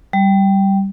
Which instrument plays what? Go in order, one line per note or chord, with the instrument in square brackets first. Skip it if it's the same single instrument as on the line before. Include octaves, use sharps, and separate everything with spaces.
[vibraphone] G3